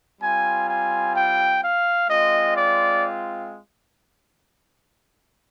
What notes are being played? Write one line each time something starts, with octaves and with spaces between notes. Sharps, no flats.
G3 C4 F4 G#5
G#5
G5
F5
G#3 C4 F4 D#5
D5